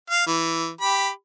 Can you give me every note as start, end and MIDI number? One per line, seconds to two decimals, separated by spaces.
0.10 0.27 77
0.27 0.70 52
0.81 1.10 67
0.81 1.10 83